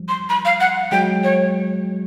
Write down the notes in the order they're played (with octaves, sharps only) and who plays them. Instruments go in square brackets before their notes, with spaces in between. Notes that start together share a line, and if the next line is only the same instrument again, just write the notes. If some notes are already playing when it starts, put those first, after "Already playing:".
Already playing: [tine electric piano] F3 G3
[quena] C6
B5
F5
F#5
[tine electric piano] F#3 G#3 [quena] G5
[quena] C#5